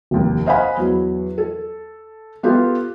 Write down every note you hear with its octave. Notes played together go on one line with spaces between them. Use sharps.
F1 D#2
C5 D#5 F5 F#5 G#5 B5
E2 F#3
A4
B3 F4 G4 A4